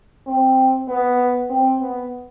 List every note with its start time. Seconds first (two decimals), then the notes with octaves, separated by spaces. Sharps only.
0.27 C4
0.88 B3
1.50 C4
1.81 B3